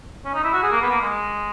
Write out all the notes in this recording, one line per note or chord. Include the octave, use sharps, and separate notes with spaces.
C#4
D#4
E4
F#4
G#4
A#3
B3
A#3
G#3